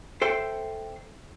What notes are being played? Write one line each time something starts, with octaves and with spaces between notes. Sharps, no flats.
A4 C5 E5 G5